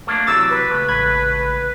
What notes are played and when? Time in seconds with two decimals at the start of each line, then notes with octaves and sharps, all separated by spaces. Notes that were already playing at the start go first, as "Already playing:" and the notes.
0.07 A3 A#3 D4
0.27 C3 E3 F#3 D6 E6 A6
0.50 B4
0.71 C#2 A3
0.89 A1 B5 G#6